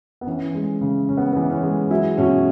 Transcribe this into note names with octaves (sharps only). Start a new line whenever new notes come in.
B3
E3 C#4
G#3
C#3
C#3 C#4
B3
E3 B3
C#4
G#3
F#3 E4
B2 C#4